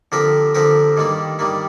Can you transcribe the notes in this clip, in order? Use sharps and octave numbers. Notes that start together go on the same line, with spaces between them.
D3 F3 C4 G4 A#4
D3 F3 C4 G4 A#4
G2 D#3 G3 A#3
G2 D#3 G3 A#3